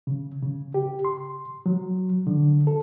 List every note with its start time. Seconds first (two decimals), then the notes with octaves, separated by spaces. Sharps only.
0.07 C#3
0.42 C#3
0.74 G4
1.05 C6
1.66 F#3
2.27 D3
2.67 A4